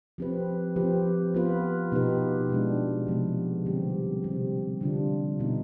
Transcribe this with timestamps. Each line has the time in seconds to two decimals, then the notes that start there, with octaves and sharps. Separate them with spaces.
0.18 F3 C4 G4 B4
0.76 F3 C4 G4 B4
1.34 B3 F4 B4
1.92 B2 B3 D#4 G4 B4
2.50 B2 G#3 D4
3.07 C3 F3 G#3 B3
3.65 D3 G3 C4 G4
4.23 C3 G3 C4 G4
4.81 D3 G3 D4 F4
5.40 B2 B3 D#4